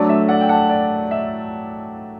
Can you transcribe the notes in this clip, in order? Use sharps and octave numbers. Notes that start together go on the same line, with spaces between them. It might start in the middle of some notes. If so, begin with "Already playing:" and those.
Already playing: F#3 A3 D4 A4 D5
E5
D5 F#5
G5
F#5 A5
D5
E5